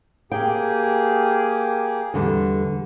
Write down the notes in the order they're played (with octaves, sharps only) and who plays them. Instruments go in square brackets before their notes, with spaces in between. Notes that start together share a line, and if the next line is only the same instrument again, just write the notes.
[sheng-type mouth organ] A#3 G4 G#4 [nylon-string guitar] G5
[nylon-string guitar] E2 D3 G3